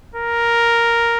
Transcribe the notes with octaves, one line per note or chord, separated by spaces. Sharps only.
A#4